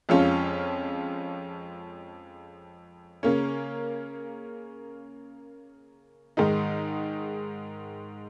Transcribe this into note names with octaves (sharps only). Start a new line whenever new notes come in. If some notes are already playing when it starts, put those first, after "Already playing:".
F2 F3 G#3 C#4 F4
C#3 A#3 C#4
G#2 D#3 G#3 D#4